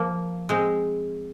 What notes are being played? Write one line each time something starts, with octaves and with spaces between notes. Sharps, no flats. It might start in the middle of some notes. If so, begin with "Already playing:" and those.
Already playing: F3 A#3
G#3 C4